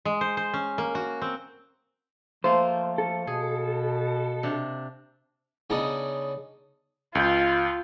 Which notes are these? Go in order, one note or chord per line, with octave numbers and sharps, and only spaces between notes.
G#3
C5
C5
C#4
A#3
F#4
C4
F3 A3 A#3 F4 C5
A4
B2 G#4
C3 D4
C#3 B3 D4 D#4
C#2 F4 G6